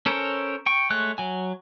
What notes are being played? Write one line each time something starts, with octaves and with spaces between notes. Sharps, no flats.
C#4 A4 A#4 C5 C#5
G5 C#6
G#3 A3 C#5 F#6
F#3 G#5